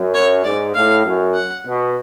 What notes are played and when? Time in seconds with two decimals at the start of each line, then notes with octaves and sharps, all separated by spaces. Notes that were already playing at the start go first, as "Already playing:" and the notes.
Already playing: F#2
0.14 C#5
0.44 G#2 D5
0.75 A2 F5
1.05 F#2
1.34 F#5
1.66 B2